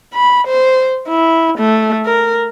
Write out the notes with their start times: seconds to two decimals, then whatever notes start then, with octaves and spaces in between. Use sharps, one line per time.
0.14 B5
0.47 C5
1.08 E4
1.58 A3
2.06 A#4